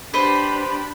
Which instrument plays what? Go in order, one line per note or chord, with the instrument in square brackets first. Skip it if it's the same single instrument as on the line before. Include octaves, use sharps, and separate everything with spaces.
[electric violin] D4 G4 [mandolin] B4 C5 [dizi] B5